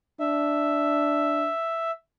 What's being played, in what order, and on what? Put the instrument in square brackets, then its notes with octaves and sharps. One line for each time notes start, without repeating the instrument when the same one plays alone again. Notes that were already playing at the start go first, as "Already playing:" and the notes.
[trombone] D4 [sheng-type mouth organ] E5